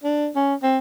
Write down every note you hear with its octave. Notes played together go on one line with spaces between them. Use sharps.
D4
C#4
C4